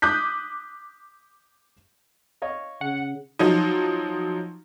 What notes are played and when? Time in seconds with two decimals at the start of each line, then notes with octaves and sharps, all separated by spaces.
0.02 D6 D#6 F#6 G6 B6
2.42 C#5 D#5 F5
2.81 C#3 F#5
3.39 F3 F#3 D#4